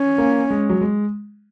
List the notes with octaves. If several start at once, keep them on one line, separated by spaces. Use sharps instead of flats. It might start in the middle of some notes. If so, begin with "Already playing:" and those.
Already playing: C#4
A#3
G#3
F#3
G#3